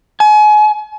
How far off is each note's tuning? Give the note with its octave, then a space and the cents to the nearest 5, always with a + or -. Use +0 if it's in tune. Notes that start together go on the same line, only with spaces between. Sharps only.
G#5 +35